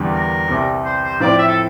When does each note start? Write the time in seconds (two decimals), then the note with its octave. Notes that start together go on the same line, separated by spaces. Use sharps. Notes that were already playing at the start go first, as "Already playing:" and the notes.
Already playing: E2 D3 G3
0.12 A#4
0.48 C2 C3 G3
0.84 C5
1.02 C5
1.20 A2 F3 C4 F4 D5
1.38 E5
1.48 A4